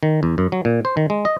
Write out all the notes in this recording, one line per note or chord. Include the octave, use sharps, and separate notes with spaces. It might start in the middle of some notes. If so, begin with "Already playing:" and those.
D#3
E2
F#2
F#3
A#2
C5
D#3
G#3
D#5